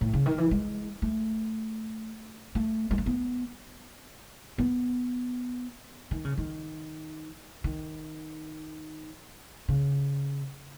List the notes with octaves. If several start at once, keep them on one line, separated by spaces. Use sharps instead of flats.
A2
C#3
D#3
E3
G#3
A3
A3
G#3
A3
B3
B3
D#3
C#3
D#3
D#3
C#3